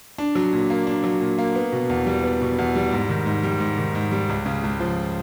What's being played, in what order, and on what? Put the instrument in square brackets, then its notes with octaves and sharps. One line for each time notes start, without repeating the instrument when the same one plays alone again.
[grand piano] D4
F#3
A#2
A#3
D4
F#3
A#2
A#3
B3
B2
E2
G3
B3
B2
E2
G3
G#2
D#3
G#2
G3
G#2
D#3
G#2
G3
C#2
C#3
C#2
F3